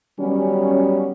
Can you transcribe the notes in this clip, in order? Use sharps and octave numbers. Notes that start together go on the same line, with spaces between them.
D#3 F#3 G3 B3 C#4